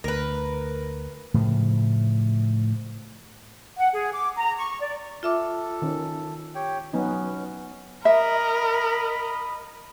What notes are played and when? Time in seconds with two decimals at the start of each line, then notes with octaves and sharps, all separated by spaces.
0.04 D2 A#4 B4
1.34 A2 C#3 F3
3.77 F#5
3.92 G#4
4.12 D6
4.36 A#5
4.57 C#6
4.80 D5
5.23 F4 A4 E5 D6
5.82 D#3 C#4
6.55 G4 C#5 G5
6.93 F#3 B3 C#4 D#4
8.05 A#4 D#5 E5 B5